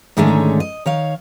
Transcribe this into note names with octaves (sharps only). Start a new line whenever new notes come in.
G#2 D3 D#3 G#3 A3 C#4
D#5
D#3 C#5 F5